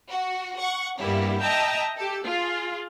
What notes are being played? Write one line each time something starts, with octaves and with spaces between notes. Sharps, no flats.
F#4
F#5 C#6
G2 G3 A#3 B3 E4
D#5 E5 G5 A5 A#5
G4 A4
F4 G#4